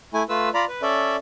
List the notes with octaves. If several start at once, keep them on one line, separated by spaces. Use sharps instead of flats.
A3 E4 G#5
A3 F4 B4 E6
F4 D5 A#5 B5
B4
C#4 A4 D5 E5